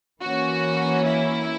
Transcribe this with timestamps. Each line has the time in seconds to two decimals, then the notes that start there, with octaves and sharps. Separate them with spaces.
0.22 E3 A#3 C#4 F#4
1.07 E4